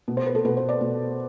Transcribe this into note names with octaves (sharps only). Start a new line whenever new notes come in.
B2
C5
B4
A4
B2 B4
C5
D5
B2